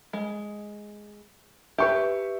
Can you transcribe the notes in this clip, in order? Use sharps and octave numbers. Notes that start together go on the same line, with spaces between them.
G#3
G4 B4 E5 C#6